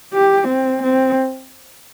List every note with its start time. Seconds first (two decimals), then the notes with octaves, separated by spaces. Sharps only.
0.14 G4
0.48 C4
0.83 C4